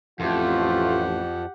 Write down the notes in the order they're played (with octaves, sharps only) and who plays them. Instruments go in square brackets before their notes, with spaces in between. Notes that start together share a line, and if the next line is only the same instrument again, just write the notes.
[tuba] A1 [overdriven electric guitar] F2 [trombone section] A3 F4 [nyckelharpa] G4 F#5